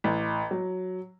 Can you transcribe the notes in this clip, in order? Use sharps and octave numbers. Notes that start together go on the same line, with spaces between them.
A1
F#3